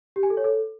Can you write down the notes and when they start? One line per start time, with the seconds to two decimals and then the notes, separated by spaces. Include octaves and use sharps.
0.16 G4
0.23 G#5
0.30 A4
0.37 C#5
0.44 A4